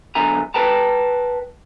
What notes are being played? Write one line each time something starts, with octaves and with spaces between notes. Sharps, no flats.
B1 D3 E5 G#5 A#5
B4 G5 A5 A#5